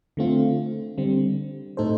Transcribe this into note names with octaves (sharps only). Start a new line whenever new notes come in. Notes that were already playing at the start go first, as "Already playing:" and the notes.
D3 A3 C4 F4
D3 G3 C4
A2 A3 D#4 A4 C5